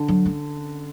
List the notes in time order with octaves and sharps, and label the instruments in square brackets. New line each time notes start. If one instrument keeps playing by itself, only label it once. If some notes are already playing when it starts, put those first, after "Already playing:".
Already playing: [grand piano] D3
[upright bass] F#3
C#4